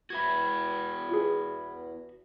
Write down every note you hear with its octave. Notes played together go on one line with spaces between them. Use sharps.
E2 F#4 B4 E5 B5 G#6
F4 G#4